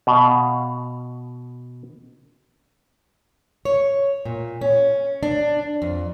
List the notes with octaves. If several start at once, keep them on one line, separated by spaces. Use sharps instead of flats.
B2 F5
C#5
A#2
C#4
D4
F2